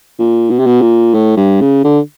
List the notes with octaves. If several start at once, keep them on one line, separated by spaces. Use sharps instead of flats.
A#2
B2
C3
B2
A#2
A2
G2
C#3
D3